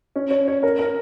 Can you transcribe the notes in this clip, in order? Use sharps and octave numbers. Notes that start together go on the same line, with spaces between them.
C#4
C#5
C#5
A#4
A#4